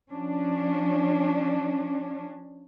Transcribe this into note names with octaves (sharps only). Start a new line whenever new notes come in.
F3 C#4 D4